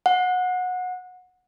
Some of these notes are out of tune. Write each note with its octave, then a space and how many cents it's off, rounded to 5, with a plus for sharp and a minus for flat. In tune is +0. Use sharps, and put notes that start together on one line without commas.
F#5 -20